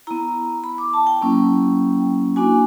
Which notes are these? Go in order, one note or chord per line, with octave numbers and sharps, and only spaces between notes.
B3 E4 A#5
B5
D6
A5
G5
F#3 A#3 C#4 E4
A#3 D4 F#4 G#5